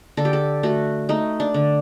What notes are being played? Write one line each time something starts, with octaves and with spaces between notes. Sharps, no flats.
D3 A4
G4
A4
A3 F#4
A3 D#4
D4
D3